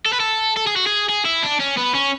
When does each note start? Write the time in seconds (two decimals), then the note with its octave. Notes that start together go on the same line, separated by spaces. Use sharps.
0.06 A4
0.13 B4
0.20 A4
0.57 A4
0.67 G#4
0.76 F#4
0.87 G#4
1.09 G#4
1.25 E4
1.43 D4
1.60 C#4
1.77 B3
1.94 C#4